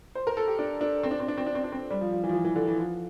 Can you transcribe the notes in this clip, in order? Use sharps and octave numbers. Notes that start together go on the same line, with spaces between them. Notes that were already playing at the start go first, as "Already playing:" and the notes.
C5
A#4
A4
G4
D4
D4
C4
D4
C4
D4
C4
D4
C4
D4
C4
G3
F3
F3
E3
F3
E3
E3
D3
E3
F3